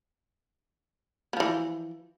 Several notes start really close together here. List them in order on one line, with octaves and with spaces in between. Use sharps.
B3 F3 E3